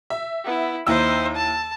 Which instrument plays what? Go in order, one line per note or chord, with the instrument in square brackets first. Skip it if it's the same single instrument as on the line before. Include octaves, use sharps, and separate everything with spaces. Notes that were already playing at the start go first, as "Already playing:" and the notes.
[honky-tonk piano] E5
[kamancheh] B3 E4
[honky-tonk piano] D#2 E4 E6 [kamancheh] D#4 C5
[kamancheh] A5